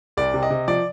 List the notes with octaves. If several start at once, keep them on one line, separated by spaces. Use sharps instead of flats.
C2 D5
C3
D#5
C3
F3 D5